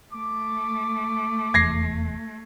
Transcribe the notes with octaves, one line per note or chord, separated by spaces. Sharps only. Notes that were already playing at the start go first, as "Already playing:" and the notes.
A3 D6
F1 E2 G#6 A#6 C7